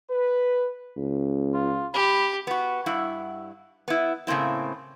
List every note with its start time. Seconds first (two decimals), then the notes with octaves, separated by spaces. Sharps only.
0.10 B4
0.96 C#2
1.54 F4
1.94 G4 B5
2.47 B3 F#4
2.86 G2 E4 F#5
3.88 B3 E4
4.27 A2 C#3 A#3 C4 E4